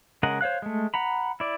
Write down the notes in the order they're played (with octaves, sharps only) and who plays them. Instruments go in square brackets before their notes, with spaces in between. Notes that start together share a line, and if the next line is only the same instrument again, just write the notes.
[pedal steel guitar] C#3 G#3 A#4 D#5 F#5
C5 C#5 F5 F#6
G#3 A3
F#5 A#5 B5
E4 D5